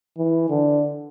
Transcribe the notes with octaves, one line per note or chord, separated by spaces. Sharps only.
E3
D3